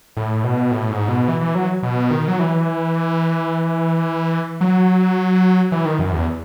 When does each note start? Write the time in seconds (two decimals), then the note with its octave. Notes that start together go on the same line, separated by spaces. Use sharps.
0.17 A2
0.44 B2
0.71 A2
0.90 G#2
1.09 B2
1.28 E3
1.41 E3
1.55 F#3
1.83 B2
2.11 D#3
2.28 F#3
2.39 E3
4.61 F#3
5.72 E3
5.85 D#3
5.99 F#2
6.13 E2